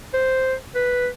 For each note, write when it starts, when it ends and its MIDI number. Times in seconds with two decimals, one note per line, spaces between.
0.14 0.54 72
0.75 1.08 71